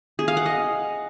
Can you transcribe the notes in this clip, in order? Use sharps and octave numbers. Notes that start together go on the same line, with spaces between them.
G#4
F5
F#5
D#5